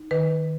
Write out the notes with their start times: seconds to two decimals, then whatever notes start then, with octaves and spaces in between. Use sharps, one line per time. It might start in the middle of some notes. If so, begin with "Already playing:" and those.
Already playing: D#4
0.11 D#3 B4